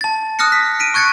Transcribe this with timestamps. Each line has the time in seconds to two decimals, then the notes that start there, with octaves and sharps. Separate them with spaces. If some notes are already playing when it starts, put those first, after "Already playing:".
0.01 A5 A6
0.39 D#6 F6 F#6 A#6 C#7
0.52 B6
0.79 B6 D7 D#7
0.94 C#6 F#6 G#6 A6 C#7